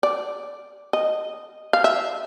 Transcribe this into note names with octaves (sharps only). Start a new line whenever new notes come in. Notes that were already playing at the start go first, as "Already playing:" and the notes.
D5
D#5
F5
E5